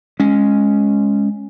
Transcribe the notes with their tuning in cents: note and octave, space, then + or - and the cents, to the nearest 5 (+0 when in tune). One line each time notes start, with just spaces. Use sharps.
G#3 +0 C#4 +0